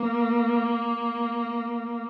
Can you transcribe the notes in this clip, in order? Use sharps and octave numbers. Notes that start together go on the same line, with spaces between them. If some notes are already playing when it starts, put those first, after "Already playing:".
Already playing: A#3